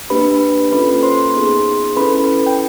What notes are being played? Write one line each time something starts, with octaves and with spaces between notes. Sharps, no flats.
A#3 D4 G4 B4 B5
A#3 C#4 F4 A4 B4 B5
C5 C6
B3 D#4 G#4
C#4 E4 A4 B4 B5
G5